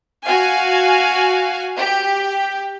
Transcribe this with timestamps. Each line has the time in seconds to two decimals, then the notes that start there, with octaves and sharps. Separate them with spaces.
0.24 F#4 F5 G#5
1.78 G4